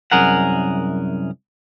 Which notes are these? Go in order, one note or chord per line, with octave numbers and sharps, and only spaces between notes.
C2 F#2 G#4 A#4 F#5